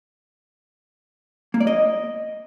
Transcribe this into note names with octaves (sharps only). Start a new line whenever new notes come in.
A#3
D5
D#5